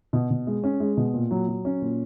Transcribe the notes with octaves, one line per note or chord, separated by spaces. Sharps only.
B2
B2
G#3
C#4
G#3
B2
A#2
F#3
F#3
C#4
A#2